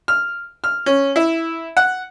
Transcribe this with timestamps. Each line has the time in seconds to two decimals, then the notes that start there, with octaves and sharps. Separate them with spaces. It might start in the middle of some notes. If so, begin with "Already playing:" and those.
0.08 F6
0.64 F6
0.86 C#4
1.16 E4
1.77 F#5